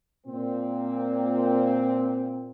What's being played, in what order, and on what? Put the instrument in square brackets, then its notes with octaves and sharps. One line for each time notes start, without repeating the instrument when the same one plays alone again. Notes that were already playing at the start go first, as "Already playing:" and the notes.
[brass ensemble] A#2 C4